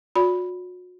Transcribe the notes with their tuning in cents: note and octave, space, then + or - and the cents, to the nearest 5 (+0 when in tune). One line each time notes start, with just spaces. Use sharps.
F#4 -40 D5 -30 B5 +0